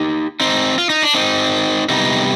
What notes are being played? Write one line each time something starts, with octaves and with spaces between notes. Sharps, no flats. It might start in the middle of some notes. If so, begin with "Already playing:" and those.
Already playing: D#4 G4
C4 D#4
F4
D#4
D4
C4 D#4
C3 G3 B3 C4 D#4